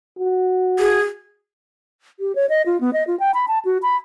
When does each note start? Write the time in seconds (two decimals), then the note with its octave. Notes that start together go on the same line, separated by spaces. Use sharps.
0.19 F#4
0.79 G#4
2.20 G4
2.35 C#5
2.50 D#5
2.66 F4
2.81 B3
2.93 D#5
3.07 F4
3.20 G5
3.34 B5
3.48 A5
3.65 F#4
3.83 B5